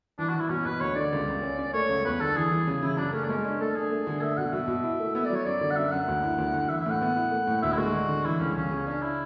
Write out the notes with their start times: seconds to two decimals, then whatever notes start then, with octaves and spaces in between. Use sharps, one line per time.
0.19 E3 D4
0.29 F#4
0.35 E3
0.40 E4
0.50 B2 C#4
0.65 B2 B4
0.81 D2 C#5
0.96 D3 D5
1.13 C#2
1.28 C#2
1.43 C#4
1.59 C#4
1.74 A3 C#5
1.89 C#2
2.04 E2 B4
2.20 D3 A4
2.36 E3 G#4
2.51 E3
2.67 C#3
2.83 C#3 E4
2.97 F#2 D4
3.13 A3 C#4
3.24 D4
3.29 G#3 C#4
3.44 C#4 D4
3.60 A3 A4
3.75 D4 G#4
3.91 A3
4.07 D3
4.21 A3 E5
4.38 B2 F#5
4.53 B2 E5
4.68 B2
4.84 E4
5.00 A3
5.15 B3 E5
5.26 F#3 D5
5.35 C#5
5.46 F#2 D5
5.61 D3
5.71 F#5
5.76 F#2 E5
5.92 F#2 F#5
6.08 D2
6.23 E4
6.38 D2
6.54 D2
6.69 E3 E5
6.80 E5
6.86 A2 F#5
7.01 B3
7.16 E4
7.31 A3
7.47 A2
7.63 D2 E5
7.73 E4
7.78 G#3 F#4
7.93 D3
8.09 D3
8.25 E3 E4
8.40 C#2 C#4
8.56 C#2 C#4
8.71 C#3
8.87 C#4 D4
9.02 E4